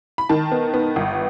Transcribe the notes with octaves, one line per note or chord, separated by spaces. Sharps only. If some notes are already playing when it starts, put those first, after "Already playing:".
B5
D#3 A5
B3
B3
G1